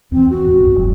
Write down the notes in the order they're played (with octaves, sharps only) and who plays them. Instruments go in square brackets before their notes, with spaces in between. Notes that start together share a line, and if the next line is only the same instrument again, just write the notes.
[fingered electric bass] E2 E3 [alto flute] C4
[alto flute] F#4
[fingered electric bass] E2 G#2
B1 G2
E1 G#2 F#3